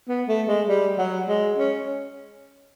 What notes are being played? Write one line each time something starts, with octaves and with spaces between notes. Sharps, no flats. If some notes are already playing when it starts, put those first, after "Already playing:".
B3
A3
G#3
G3
F#3
G#3
C#4